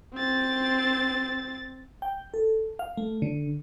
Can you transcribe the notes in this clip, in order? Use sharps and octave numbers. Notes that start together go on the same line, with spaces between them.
C4 A6
G5
A4
F5
A3
D3